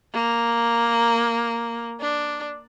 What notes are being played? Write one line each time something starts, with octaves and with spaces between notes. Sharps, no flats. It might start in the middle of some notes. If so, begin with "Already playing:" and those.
A#3
D4